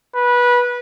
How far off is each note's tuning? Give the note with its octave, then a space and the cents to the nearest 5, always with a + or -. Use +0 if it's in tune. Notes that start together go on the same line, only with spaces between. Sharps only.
B4 -20